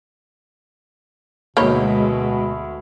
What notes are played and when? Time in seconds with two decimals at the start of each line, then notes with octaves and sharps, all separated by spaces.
1.57 D2 B2 G#3 A#3 D#4 C#5 B5